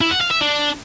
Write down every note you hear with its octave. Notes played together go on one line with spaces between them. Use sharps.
E4
F#5
F5
E5
D4